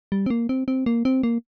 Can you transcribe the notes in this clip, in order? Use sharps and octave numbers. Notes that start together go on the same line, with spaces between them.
G3
C4
A#3
C4
C4
A#3
C4
A#3